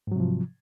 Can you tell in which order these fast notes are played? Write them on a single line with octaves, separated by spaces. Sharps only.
G#2 F#3 C3 F3